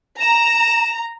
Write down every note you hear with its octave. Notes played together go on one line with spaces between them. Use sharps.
A#5 E7